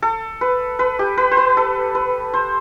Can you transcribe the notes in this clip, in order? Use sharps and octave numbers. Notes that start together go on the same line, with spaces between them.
A4
B4
B4
G4
B4
C5
B4
A4
B4
C5